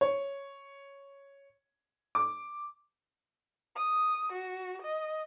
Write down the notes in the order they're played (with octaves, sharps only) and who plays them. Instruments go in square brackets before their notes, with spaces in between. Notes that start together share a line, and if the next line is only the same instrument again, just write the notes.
[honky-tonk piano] C#5
D6
[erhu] D#6
F#4
D#5